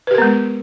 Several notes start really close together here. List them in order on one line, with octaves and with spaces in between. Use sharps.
B4 G4 A#4 B3 G#3